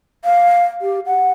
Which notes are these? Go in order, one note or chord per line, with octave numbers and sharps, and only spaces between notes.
F5
G4
F#5